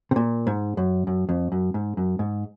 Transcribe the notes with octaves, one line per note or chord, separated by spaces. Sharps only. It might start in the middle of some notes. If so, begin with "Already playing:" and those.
C3
A#2
G#2
F#2
F#2
F2
F#2
G#2
F#2
G#2